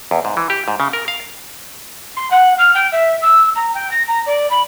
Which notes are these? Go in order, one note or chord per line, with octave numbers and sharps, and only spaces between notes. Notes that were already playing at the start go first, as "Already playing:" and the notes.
E2
G#2
E3
G4
G#2
C#3
A#4
F5
C6
F#5
F6
G5
E5
E6
A#5
G5
A#6
A#5
D5
B5